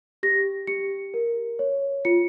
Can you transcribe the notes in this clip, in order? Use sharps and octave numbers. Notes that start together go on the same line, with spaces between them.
G4 A#6
G4 C#7
A#4
C#5
F4 C#7